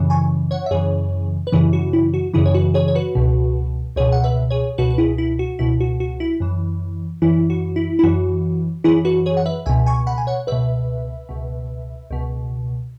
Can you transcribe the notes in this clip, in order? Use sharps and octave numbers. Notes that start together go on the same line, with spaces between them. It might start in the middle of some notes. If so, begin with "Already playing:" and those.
Already playing: F#2 C#3 E3
G#5 C#6
C#5 F#5
E5
F#2 C#3 E3 G#4 C#5
B4
F#2 C#3 E3 E4 G#4
F#4
E4
F#4
F#2 C#3 E3 E4 G#4
C#5
F#4 B4
G#4 C#5
C#5
F#4 B4
C#2 B2
C#2 B2 G#4 C#5
F#5
B4 E5
G#4 C#5
C#2 B2 F#4 B4
B4
E4 G#4
E4
F#4
C#2 B2 E4
F#4
F#4
E4
F#2 E3
F#2 E3 E4
F#4
E4
E4
F#2 E3 F#4
F#2 E3 E4 G#4
F#4 B4
G#4 C#5
F#5
B4 E5
C#2 B2 E5 G#5
G#5 C#6
F#5 B5
G#5
C#5 F#5
C#2 B2 B4 E5
C#2 B2
C#2 B2